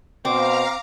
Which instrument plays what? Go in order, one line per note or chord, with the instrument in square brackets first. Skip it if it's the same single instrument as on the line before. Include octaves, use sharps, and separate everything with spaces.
[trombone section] B2 C5 [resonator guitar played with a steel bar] C4 [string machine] F5 A#5 [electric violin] D6